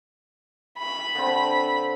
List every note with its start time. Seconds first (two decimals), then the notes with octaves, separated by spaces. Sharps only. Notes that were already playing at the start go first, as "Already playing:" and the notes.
0.78 B5
1.15 D3 C4